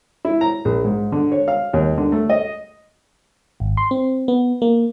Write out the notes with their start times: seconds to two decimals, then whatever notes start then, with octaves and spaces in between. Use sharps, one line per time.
0.25 E4
0.41 A#5
0.65 A#1
0.84 G#2
1.12 D3
1.32 C#5
1.48 F5
1.73 D#2
1.98 D3
2.12 A3
2.30 D#5
3.60 G#1
3.77 C6
3.91 C4
4.28 B3
4.62 A#3